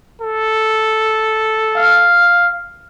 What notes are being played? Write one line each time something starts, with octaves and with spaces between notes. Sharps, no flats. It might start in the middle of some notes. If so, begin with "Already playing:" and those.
A4
F5